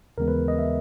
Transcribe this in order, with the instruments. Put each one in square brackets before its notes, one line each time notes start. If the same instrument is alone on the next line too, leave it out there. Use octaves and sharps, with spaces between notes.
[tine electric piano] D#2 C#3 E3 G#3 B3 A#4
B4
D#5
E5